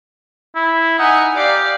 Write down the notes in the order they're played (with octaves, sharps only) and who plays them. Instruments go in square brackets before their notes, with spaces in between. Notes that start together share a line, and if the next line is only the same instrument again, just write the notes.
[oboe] E4
[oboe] D#4 [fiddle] F#5 G#5
[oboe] G4 [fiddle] D5 F5